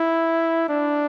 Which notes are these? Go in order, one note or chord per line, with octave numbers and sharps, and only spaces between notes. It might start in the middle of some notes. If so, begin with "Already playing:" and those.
Already playing: E4
D4